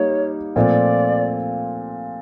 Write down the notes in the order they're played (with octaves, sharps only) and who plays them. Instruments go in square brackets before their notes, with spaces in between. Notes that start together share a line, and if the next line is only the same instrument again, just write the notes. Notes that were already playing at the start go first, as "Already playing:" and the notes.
Already playing: [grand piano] G3 A#3 D#4 [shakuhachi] C#5
[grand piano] A#2 F3 A3 C4 [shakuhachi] D#5
[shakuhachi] D5